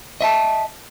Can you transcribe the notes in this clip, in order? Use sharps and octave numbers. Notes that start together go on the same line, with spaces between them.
D#5 E5 A5